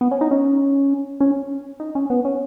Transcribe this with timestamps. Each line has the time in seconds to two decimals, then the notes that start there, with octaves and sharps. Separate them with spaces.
0.01 B3
0.11 C#4
0.21 D#4
0.31 C#4
1.20 C#4
1.80 D#4
1.95 C#4
2.10 B3
2.25 C#4